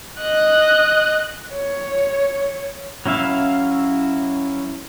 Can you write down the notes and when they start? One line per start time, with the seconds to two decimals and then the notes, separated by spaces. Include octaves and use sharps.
0.20 D#5 F#6
1.53 C#5
3.06 F#3 C#4 E4 E5 F5